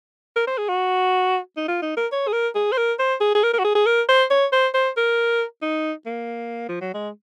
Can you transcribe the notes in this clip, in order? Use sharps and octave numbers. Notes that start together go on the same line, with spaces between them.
A#4
C5
G#4
F#4
D#4
F4
D#4
A#4
C#5
G#4
A#4
G#4
C5
A#4
C5
G#4
G#4
A#4
A#4
F#4
G#4
G#4
A#4
C5
C#5
C5
C5
A#4
D#4
A#3
F3
F#3
G#3